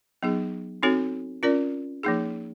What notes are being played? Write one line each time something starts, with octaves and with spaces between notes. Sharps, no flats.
F#3 B3 D#4 G#4
C4 D#4 F#4 A4 C#5
C#4 F4 A#4 D5
F3 A#3 D#4 G#4